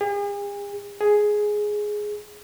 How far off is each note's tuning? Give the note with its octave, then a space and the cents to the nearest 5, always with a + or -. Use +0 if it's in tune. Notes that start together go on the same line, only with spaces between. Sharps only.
G#4 -45
G#4 +5